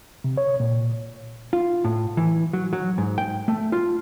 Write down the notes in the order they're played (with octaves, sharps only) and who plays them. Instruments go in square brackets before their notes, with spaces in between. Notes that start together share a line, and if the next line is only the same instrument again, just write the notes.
[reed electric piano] C3
C#5
A#2
[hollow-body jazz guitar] F4
A2
E3
F#3
F#3
G#2
G5
A3
F4